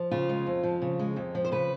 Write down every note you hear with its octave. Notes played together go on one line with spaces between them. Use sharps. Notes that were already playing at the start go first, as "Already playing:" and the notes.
Already playing: F3
C#3 F4
G#3
F2
F3
C#3
G#3
F2
F3
C5
C#3 B4